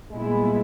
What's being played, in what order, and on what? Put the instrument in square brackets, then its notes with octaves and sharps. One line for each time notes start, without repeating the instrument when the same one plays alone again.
[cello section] A#2 G3 B3 E4 [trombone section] G#3